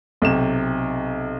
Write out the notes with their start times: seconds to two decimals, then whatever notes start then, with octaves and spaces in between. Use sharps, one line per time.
0.22 B1 C3 E7